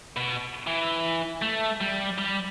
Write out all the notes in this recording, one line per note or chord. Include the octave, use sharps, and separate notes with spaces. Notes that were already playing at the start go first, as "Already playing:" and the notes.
B2
E3
A3
G3
G3